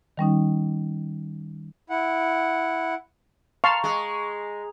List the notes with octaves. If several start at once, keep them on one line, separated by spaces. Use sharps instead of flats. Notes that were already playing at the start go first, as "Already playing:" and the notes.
D#3 G3 C#4 D#4
E4 F#5
F5 A5 A#5 C6 C#6 F7
G#3